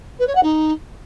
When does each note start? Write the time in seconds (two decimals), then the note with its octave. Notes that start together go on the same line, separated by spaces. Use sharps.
0.19 B4
0.27 C#5
0.35 F#5
0.43 D#4